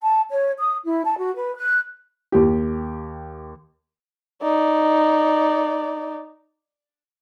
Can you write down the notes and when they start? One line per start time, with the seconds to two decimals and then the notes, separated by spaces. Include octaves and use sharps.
0.02 A5
0.30 C#5
0.58 D#6
0.84 E4
1.04 A5
1.17 F#4
1.36 B4
1.57 F#6
2.32 D#2 G4
4.43 D#4 D5